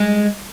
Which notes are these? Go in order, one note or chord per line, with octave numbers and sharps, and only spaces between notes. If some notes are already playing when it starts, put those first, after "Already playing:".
Already playing: G#3